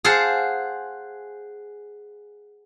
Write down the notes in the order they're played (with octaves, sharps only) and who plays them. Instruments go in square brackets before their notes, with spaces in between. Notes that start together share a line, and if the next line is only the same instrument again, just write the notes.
[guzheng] G#4 C5 F5 F#5 A5